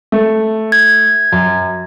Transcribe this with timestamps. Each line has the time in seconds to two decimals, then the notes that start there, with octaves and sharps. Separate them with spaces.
0.12 A3
0.72 G#6
1.32 F#2